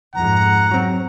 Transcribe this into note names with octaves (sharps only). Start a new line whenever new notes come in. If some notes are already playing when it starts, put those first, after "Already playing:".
F2 G#2 F#5 A#5
F#3 C4